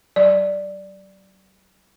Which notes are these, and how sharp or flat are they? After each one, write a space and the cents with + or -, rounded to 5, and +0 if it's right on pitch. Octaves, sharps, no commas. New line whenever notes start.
F#3 +45 D5 +0